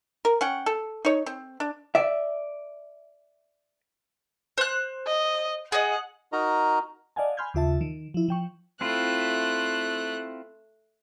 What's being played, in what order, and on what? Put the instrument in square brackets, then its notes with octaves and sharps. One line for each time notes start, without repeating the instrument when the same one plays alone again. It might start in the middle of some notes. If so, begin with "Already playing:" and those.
[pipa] A#4
C#4 F#5 G5
A4
D#4 C#5
C4
D4
[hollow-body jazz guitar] D5 E5
[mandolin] C5 F#6
[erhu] D#5
[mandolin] G#4 D#5 [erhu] F#5
[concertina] D#4 F#4 A#4 D#5 A#5
[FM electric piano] D5 D#5 F5 F#5 G#5 A5
G#5 B5 C6 F6 G6 G#6
D#2 C#3 F4 E5 A5
D#3
F3 E4
F3 G5 C#6
[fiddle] A3 F#6 [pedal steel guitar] C4 E4 F4